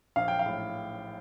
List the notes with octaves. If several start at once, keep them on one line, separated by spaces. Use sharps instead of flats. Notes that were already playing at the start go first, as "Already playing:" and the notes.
A#1 F5
G5
F5
A2